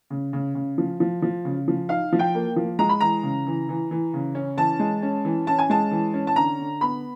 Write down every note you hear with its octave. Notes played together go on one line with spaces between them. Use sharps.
C#3
C#3
C#3
F3
F3
F3
C#3
F3
D#4 F5
F3
G5
A#3
F3
G#3 A#5
B5
E3 A#5
C#3
E3
E3
E3
C#3
C#4
E3 A5
G#3
C#4
E3
C#4 A5
G#5
G#3 A5
E3
C#4
A5
D3 A#5
D3
B3 B5